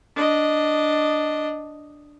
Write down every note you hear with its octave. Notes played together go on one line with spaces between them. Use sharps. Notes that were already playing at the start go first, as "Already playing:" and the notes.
D4 D#5